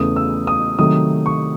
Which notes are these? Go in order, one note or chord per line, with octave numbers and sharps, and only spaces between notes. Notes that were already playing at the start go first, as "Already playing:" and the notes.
Already playing: E2 C#3 E3 A3 D#6
E6
D#6
C3 D#3 F#3 A3 D#6
C#6